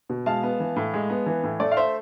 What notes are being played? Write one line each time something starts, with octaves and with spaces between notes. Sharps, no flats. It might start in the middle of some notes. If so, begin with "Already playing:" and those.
B2
G#3 F5 A5
B3
E3
A2
G#3
B3
E3
A2
A3 D5
F5
C5 E5